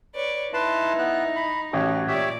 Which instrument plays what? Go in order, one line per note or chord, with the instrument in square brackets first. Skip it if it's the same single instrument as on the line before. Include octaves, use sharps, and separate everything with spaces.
[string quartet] B4 C#5 D5
[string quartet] D#4 [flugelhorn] E4 [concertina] B4 A5 C6
[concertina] B3 F#6
B5
[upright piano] A1 [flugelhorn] F#4 [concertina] G4
[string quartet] A#2 D5 [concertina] G4 C#5 E5